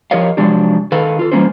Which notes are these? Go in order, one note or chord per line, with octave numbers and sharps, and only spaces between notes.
F3 G4 A#4 C#5 D#5 F5
C3 F3 F#3 G#3 D4 G4
D#3 A4 B4 F5
F4 A4
E3 G3 A#3 C#4 F4 C5